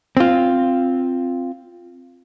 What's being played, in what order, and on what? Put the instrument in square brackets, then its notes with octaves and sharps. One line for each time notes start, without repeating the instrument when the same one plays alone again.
[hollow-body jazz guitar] C4 F4